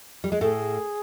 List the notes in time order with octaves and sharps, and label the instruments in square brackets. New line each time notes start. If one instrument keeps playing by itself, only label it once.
[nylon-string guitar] G3
G#3
[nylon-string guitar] A2 A3 [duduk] G#4